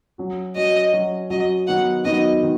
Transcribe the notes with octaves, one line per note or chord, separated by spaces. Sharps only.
F#3 C#4 F#4
F#3 C#4 F#4 D#5
F#3 C#4 F#4
F#3 C#4 F#4 D#5
D#3 F#3 B3 D#4 F#4 F#5
D#3 F#3 B3 D#4 F#4 D#5
D#3